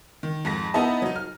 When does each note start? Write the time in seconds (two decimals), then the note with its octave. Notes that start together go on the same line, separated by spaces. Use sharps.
0.23 D#3
0.45 F2 G#2 A#6
0.74 B3 D#4 E4 B4 D#5 A5
1.02 F#3 D#4
1.16 F6